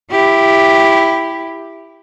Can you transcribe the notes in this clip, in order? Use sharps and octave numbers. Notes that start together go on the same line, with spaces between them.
E4 G4